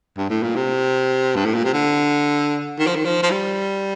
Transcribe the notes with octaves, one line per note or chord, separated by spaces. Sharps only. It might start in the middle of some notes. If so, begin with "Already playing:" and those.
G2
A2
A#2
C3
G2
A2
A#2
C3
D3
D#3
F3
D#3
F3
F3
G3